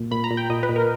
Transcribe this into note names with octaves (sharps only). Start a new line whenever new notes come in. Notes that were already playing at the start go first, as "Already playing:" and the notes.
Already playing: A#2
A#2 B5
A#5
A#2
G5
A#2 D#5
B4
A#2
A#4